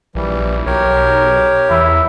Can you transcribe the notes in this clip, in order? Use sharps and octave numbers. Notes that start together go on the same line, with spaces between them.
A#1 E3 G3
B1 G4 A#4 C#5
E2 E4